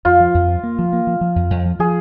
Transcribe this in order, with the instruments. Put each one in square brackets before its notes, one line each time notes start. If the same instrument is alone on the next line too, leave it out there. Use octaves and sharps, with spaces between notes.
[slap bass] F2 [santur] F4
[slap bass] F3
F2
F3
A#3
F3
A#3
F3
F3
F2
F2
F3
[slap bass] F3 [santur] G#4